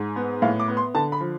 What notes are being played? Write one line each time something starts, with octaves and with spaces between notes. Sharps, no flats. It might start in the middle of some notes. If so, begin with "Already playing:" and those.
Already playing: G#2
B3
A2 F5
D6
B3
C6
D3 A5
B5
F3